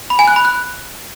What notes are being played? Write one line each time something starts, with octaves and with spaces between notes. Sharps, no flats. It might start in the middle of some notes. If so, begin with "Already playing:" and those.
B5
G#5
F#6
B5
F#6